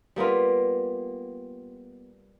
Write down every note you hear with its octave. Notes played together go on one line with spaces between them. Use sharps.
G3 A#3 B3 F4